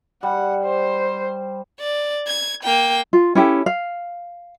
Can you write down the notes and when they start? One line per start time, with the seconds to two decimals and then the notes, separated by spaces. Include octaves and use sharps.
0.23 G3 F#5
0.65 C5
1.80 D5
2.27 G#6
2.63 A#3 G5
3.13 F4
3.35 C#4 E4 G4 A4
3.66 F5